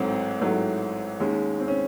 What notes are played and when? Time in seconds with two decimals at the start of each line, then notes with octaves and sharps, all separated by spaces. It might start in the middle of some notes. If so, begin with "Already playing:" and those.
Already playing: A1 G#2 F#3 A3 C4
0.41 A1 G#2 F#3 A3
1.20 D#2 D#3 G#3 C#4
1.60 C4
1.68 C#4